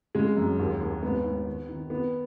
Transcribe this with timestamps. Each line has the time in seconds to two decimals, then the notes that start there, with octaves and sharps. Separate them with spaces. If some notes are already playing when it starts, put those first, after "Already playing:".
0.15 C#3 G#3
0.37 F#2
0.59 D#2
0.81 D#2
1.02 G#2 B3
1.25 G#2
1.47 D#3
1.69 D#3
1.90 D#3 B3